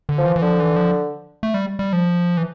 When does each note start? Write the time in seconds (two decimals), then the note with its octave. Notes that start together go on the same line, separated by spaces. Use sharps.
0.09 D3
0.18 F3
0.25 E3
0.36 E3
0.42 D3 F3
0.60 E3
0.76 F3
1.43 A3
1.54 G3
1.79 G3
1.93 F3
2.37 E3